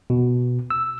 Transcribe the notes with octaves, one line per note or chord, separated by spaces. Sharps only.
B2
E6